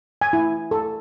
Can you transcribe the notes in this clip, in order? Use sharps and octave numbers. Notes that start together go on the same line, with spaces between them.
G#5
E4
A4